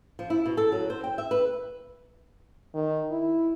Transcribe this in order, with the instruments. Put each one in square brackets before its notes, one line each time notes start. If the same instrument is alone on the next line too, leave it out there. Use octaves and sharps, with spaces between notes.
[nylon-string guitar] F3
E4
B2
A4
F#3
C5
G5
E5
B4
[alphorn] D#3
E4